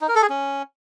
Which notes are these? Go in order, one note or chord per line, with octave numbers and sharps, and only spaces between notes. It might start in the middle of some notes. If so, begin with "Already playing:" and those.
D#4
A#4
A4
G#4
C#4